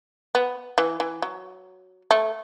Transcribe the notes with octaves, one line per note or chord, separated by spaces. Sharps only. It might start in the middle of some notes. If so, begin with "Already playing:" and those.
B3
E3
E3
F#3
A3